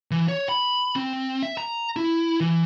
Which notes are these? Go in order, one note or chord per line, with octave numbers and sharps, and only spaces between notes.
E3
C#5
B5
C4
E5
A#5
E4
E3